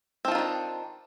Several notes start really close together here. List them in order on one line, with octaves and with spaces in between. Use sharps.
C4 F3 F4 D#3 D4